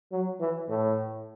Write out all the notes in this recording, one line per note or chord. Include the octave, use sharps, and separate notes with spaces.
F#3
E3
A2